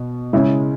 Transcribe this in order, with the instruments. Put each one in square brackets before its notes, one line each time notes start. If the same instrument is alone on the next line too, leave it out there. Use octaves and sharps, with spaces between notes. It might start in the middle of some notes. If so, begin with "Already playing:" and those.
Already playing: [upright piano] B2
C#3 G#3 C#4 E4